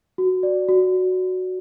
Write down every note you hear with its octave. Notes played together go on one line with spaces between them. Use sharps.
F#4
D5
F#4